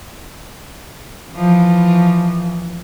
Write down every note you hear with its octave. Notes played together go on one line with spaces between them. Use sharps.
E3 F3